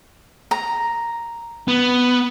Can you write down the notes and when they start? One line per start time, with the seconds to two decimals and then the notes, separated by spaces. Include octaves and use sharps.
0.51 A#5
1.68 B3